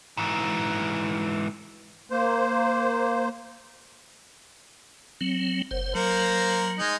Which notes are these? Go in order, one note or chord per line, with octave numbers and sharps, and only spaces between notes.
G#2 E3
A#3 C5
F#3 C4
F#1 C5
F#3 A#3 A#4 C5
G#3 D#4